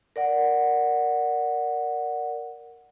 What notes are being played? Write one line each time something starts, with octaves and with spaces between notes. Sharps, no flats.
A#4 D5 F#5